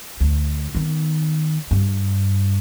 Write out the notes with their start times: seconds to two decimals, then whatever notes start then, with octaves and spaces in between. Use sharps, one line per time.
0.20 D2
0.75 D#3 B3
1.71 G2